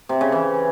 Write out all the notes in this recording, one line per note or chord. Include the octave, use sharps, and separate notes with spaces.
C3
C#3
E3